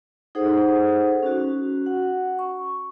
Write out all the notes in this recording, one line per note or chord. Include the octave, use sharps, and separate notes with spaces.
D#4 G#4 A4 C5 F#5
C#4 F#4
F#5
C#6